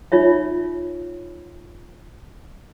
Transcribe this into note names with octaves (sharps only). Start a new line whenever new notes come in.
D#4 F4 C#5 E5